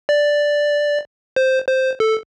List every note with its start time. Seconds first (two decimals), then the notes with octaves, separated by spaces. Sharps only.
0.09 D5
1.36 C5
1.68 C5
2.00 A4